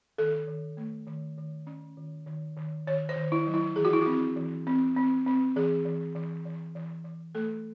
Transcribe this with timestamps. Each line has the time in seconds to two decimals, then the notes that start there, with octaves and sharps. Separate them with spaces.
0.18 D#3 A4
0.47 D#3
0.77 A3
1.07 D#3
1.38 D#3
1.67 C#4
1.97 D#3
2.27 D#3
2.57 D#3
2.87 D#3 C#5
3.09 C5
3.16 D#3
3.32 E4
3.47 F#3
3.54 E4
3.76 E3 G#4
3.85 F#4
3.93 E4
4.02 C4 F#4
4.36 E3
4.67 C4
4.97 C4
5.27 C4
5.56 E3 G#4
5.85 E3
6.15 E3
6.45 E3
6.75 E3
7.05 E3
7.35 A3 A4